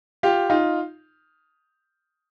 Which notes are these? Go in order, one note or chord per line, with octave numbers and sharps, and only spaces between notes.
F4 G4
D#4 F4